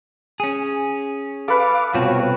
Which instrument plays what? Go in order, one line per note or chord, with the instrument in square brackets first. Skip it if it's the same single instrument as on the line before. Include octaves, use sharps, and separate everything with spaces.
[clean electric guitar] C#4 G#4
[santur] A4 B4 [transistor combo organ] F5 D6
[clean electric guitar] C2 B2 C4 [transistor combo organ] F4 F#4 C#5